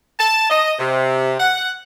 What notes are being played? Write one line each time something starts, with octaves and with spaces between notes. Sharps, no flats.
A5
D#5
C3
F#5